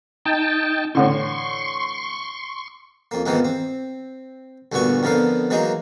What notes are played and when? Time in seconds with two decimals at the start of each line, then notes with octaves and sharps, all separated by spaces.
0.26 D#4 G5 A5
0.95 A2 D3 E3 C6 C#6
3.11 F2 A#3
3.26 F2 G#2 D#3 E3 A#3 B3
3.45 C4
4.72 D2 G2 A#2 B3 F#4 C#6
5.03 F2 D3 F3 B3 A#4 F5
5.50 E3 F#3 G#3 A#3 D#4